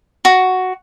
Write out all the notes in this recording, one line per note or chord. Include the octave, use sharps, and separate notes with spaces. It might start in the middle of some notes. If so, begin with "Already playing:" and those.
F#4